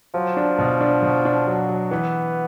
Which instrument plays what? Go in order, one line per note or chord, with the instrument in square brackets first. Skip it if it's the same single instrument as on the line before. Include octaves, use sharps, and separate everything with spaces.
[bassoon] F3 [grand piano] F#3
[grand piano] D4
B2
D4
B2
D4
F#3
F#3
[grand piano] E3 [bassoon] B3